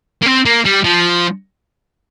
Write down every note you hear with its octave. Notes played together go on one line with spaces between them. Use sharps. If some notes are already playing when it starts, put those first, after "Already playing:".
A#3
C4
A#3
G3
F3